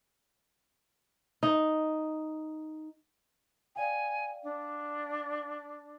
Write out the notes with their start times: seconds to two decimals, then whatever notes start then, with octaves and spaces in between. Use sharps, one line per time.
1.43 D#4
3.76 D5 F5 G5 G#5
4.43 D4